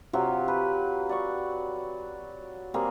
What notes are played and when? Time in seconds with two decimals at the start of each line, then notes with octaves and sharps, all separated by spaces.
0.13 C3 F#3 F4 G4
0.48 B4
1.09 D5 F#5 C#6
2.74 G3 A#3 C4 G#4